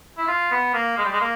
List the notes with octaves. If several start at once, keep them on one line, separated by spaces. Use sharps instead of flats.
E4
F4
B3
A#3
G#3
G3
G#3
A#3